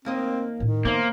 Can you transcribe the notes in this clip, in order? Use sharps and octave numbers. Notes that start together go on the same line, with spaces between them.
D#2 A#3 C4 D#5
A2 D#3 C#4
F2 A#3 B3 C5 E5